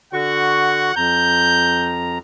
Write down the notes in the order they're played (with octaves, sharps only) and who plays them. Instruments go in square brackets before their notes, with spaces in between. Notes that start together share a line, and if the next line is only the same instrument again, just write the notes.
[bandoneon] D3 F#4 C#6 [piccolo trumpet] F#5
[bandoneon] F2 A#5 [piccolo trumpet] G6